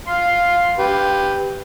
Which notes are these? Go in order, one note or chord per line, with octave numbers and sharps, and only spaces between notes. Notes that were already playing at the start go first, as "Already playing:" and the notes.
F5 C6
G4 B4